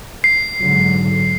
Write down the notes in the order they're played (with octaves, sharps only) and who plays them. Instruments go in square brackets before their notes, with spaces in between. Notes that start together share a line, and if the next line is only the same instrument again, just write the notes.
[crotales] C7
[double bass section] G#2 D3 F#3